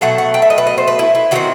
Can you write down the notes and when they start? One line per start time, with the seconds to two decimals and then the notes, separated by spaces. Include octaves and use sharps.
0.01 B2 F#3 A3 F#5
0.18 F#5
0.34 G5
0.42 E5
0.50 D#5
0.58 B4
0.67 D#5
0.78 C5
0.88 B4
0.99 E4
1.15 E4
1.31 D#3 F#3 A3 C4 F#4